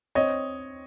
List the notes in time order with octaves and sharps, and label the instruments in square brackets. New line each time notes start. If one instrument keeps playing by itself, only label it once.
[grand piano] C4 C#5 D#5